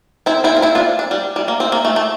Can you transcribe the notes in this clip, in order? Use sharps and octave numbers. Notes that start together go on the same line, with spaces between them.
C4 E4
C4 E4
F4
C4 E4
D4 F4
D4
G3
G3
A#3
C4
A#3
A3
A3